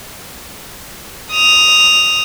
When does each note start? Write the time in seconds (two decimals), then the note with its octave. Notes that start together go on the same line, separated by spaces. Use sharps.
1.32 D#6 F7